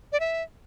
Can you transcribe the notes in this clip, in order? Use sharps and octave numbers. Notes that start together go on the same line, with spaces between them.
D5
E5